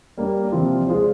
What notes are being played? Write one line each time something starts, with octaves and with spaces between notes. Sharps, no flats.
G3 A#3 D4
C3 F3 C4 F4
G#3 D4 F4 G#4 C5